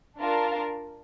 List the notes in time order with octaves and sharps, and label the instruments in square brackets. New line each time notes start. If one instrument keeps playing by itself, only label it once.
[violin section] D4 F4 A#4 F5 A5